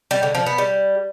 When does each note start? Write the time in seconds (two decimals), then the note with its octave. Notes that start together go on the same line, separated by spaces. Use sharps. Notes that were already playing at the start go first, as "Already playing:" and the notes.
0.11 G3
0.23 D3
0.35 F3
0.46 B3
0.58 G3